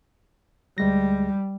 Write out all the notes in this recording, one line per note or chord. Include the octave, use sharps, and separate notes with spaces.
D2 G3 G#3 A#6